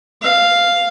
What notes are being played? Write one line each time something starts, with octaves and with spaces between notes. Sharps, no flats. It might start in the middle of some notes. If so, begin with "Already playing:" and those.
F5